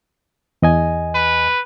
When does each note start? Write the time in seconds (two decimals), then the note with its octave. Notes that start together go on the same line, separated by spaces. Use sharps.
0.62 E2 D#5 G#5
1.15 B4